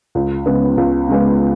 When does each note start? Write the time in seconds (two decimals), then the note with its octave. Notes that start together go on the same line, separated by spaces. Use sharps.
0.15 C#2
0.46 C#3 G#3 B3
0.77 C#2
1.08 C#3 G#3 B3